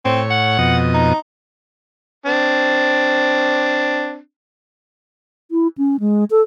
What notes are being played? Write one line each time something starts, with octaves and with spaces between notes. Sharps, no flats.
A2 C4 C#5
F#5
F2 B2 D#5
D#4
C4 D4
E4
C#4
G#3
A4